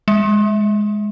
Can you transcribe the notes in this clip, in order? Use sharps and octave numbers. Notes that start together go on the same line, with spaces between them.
G#3